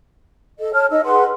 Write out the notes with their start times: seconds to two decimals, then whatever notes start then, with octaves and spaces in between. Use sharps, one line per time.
0.59 A4 D#5
0.73 C#5 A5 F6
0.90 D#4 D#5 E6
1.04 G#4 B4 F#5 C6